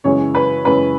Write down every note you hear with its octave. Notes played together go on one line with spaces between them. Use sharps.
F#2 C#3 E3 G#3 C#4 C#5
B4
F#2 C#3 E3 G#3 C#4 B4